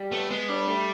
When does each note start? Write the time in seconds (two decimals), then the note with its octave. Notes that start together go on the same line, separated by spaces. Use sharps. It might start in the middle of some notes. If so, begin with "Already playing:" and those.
Already playing: G3
0.12 A3 B3
0.30 G#3 B3
0.49 G3 D4
0.68 A3